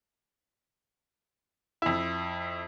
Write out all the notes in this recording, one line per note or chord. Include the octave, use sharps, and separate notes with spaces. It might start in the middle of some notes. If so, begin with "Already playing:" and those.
F2 E4